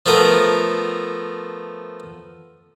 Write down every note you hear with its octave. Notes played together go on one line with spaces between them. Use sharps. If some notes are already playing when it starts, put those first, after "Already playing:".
F3 A3 B3 A#4